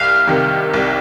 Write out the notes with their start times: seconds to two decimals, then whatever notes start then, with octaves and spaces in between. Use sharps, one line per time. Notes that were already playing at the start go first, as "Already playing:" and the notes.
Already playing: C2 F5
0.27 C3 D#3
0.74 C2